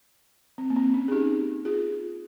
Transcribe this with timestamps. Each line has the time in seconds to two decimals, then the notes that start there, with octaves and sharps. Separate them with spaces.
0.58 C4
0.70 A#3
0.76 C4
0.94 C#4
1.08 G#4
1.12 D#4 G4
1.65 F4 G#4